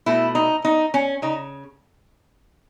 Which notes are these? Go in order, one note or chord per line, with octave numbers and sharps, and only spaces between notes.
B2 A3 E4
D#4
D#4
C#4
C#3 D#4